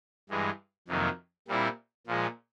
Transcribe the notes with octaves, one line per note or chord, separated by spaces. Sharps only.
G2 E3 G#3
F2 C3 D#3 F#3 A#3
A#2 G3 C4 E4
A#2 F3 G#3